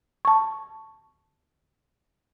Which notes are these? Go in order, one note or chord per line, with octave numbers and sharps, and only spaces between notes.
A5 C#6